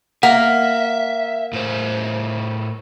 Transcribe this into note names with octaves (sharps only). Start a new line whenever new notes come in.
A#3 E5 F#5
A2 C5